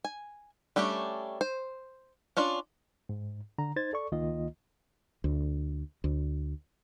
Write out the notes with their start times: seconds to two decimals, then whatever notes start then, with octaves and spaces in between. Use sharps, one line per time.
0.05 G#5
0.76 G3 A3 C#4 D4 G4
1.41 C5
2.37 C#4 D4 F4 D5
3.09 G#2
3.58 D3 A#5
3.76 D#4 C5 G#6 A6
3.93 A4 D5 C#6
4.12 C#2 D#3 A#3 F4 D#5
5.24 D2
6.04 D2